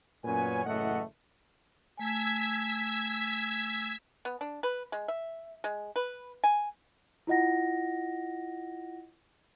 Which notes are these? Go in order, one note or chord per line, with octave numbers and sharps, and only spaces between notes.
F#2 A#2 B3 C#4 B4 G#5
F#1 A2 E3 A3 D#5 F#5
A3 G#5 E6 G#6 B6
B3
D4
B4
G#3
E5
G#3
B4
G#5
E4 F4 D#5 F#5 A#6